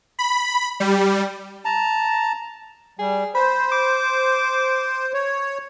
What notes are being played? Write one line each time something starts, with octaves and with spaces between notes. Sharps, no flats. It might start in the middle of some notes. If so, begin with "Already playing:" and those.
B5
G3
A5 A#5
G3 G#4
C5 B5
D6
C#5